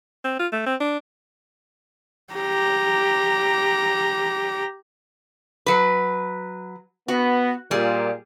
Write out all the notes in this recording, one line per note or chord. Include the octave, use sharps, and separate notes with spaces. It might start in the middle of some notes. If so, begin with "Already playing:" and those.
C4
F4
A3
C4
D4
G4 A#5
F#3 B4
B3 F#4
A#2 G3 G#4